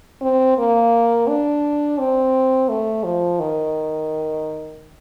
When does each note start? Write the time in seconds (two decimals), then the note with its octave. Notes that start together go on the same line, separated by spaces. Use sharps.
0.21 C4
0.58 A#3
1.28 D4
1.98 C4
2.69 A3
3.04 F3
3.39 D#3